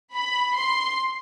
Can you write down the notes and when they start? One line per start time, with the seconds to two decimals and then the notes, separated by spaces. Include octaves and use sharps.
0.13 B5
0.55 C6